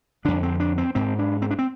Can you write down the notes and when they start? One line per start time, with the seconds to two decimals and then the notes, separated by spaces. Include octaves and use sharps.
0.25 F2 D3 D4
0.43 C4
0.60 D4
0.78 C4
0.95 G#2 C4
1.19 D4
1.42 C4
1.51 D4
1.59 C4